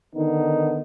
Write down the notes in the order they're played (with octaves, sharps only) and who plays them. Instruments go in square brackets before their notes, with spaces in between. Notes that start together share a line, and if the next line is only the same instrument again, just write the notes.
[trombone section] D3 D#3 B3 D#4